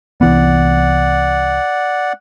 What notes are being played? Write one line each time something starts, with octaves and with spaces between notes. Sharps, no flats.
C2 E3 B3 D5 F#5